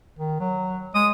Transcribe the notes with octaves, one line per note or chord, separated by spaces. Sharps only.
D#3
F#3
G#3 D#6